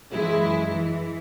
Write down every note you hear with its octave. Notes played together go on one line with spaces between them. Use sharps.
F#2 E3 G#3 E4
E3